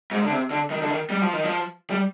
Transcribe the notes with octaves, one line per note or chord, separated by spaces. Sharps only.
G#2
D3
C3
D3
D#3
D3
D#3
G3
F3
D#3
F3
G3